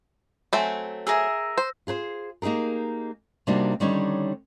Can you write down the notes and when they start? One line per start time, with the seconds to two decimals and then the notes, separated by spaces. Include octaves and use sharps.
0.53 F#3 A3 C4 G#5
1.07 G#4 A#4 E5 E6 A#6
1.58 C5
1.87 F4 G#4 B4 C5
2.42 A#3 D#4 G4 G#4 A#4
3.47 C3 G3 A#3 D4 D#4 F#4
3.80 D3 D#3 G3 C#4 D#4 C#5